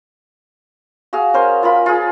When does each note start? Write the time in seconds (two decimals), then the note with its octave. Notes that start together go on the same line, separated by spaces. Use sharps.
1.13 F#4 G#4 F5
1.34 C#4 A#4 C5
1.63 F4 A#4 B5
1.86 F4 G#4